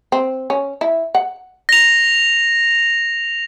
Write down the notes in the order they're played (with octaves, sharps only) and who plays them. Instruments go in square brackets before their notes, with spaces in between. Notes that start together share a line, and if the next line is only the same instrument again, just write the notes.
[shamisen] C4
C#4
E4
F#5
[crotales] A#6 F7